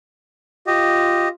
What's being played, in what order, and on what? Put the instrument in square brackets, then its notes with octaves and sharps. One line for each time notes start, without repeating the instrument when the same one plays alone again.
[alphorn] F4 [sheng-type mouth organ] G4 D#5